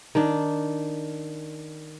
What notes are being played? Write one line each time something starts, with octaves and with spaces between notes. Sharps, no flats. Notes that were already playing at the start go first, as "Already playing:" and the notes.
D#3 D4